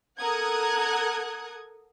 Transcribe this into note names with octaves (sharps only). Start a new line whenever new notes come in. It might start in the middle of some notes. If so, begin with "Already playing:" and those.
A4 A#4 F#5 D#6 F#6 G#6